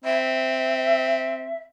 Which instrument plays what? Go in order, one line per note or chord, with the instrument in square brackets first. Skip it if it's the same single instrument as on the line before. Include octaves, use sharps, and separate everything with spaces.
[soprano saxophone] C4 [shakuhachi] E5